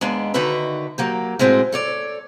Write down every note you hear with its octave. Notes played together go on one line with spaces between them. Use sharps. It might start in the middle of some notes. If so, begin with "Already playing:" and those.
D#2 G#3 B3 D4
D3 D#3 D#4 F#4 B4 E5
F#3 A#3 G4
A2 G#3 C4 F#4
A4 C#5 D5